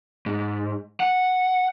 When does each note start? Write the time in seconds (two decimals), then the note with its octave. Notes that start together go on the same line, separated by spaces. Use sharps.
0.26 G#2
1.00 F#5